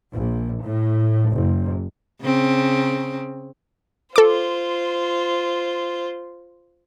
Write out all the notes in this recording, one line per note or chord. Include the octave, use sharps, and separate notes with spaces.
A#1
A2
F#1
C#3 C4
F4 A4 C5 D6